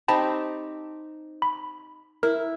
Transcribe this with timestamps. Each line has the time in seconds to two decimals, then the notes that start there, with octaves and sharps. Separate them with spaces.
0.08 C4 D#4 G4 G5 A5 B5
1.42 B5
2.23 E4 A#4